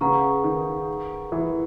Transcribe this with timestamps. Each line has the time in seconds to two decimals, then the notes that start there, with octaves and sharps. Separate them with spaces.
0.01 C#3 G#4 B4 F#5 A#5 C#6
0.44 D#3
1.32 E3